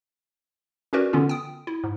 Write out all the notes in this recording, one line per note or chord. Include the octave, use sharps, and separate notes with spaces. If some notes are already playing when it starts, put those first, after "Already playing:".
C#4 F#4 G4 A#4 B4 D5
D3 B3 C#4 F4
G5 D#6
E4
G#2